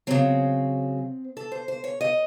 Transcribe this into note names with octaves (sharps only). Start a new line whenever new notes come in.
C#3 F#3 C4
A4
C5
C5
C#5
D#5